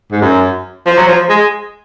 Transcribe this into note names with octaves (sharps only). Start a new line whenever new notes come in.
G#2
F#2
F3
F#3
F3
G#3